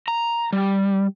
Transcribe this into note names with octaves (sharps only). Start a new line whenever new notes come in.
A#5
G3